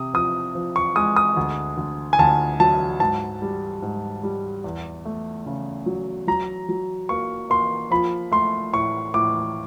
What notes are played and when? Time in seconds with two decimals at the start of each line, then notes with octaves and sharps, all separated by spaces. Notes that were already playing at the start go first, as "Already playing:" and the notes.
Already playing: C3 D#6
0.14 F3 D#6
0.55 F3
0.76 C#6
0.96 G#3 D#6
1.16 D#6
1.37 D2
1.77 D2
2.13 G#5
2.19 D2 A5
2.60 F#3 A5
3.00 G#2 A5
3.42 G3
3.82 G#2
4.23 G3
4.64 E2
5.05 A3
5.46 C#3
5.86 F#3
6.27 F#3 A#5
6.69 F#3
7.09 A#3 C#6
7.50 A#3 C6
7.91 F3 B5
8.32 A3 C6
8.73 A2 C#6
9.14 A2 D6